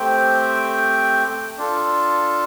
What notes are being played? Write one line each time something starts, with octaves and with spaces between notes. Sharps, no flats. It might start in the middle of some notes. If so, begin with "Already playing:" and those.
Already playing: A3 C4 G4 C5 G5
D4 F4 A4